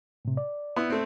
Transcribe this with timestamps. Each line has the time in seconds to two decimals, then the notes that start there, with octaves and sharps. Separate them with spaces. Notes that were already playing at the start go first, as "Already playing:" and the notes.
0.25 A2 C3
0.37 D5
0.76 B3 E4
0.90 A3 C4